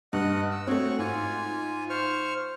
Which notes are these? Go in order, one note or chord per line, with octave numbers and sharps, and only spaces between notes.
G2 D#5 F#5
E6
A3 C4 F#4 C#5 C#6
G#2 F4 G#5
C5 C#6 F6